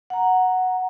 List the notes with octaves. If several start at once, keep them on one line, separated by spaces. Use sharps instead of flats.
F#5 A#5